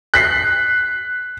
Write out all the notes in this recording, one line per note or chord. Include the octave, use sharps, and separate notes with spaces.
F#6 B6 C7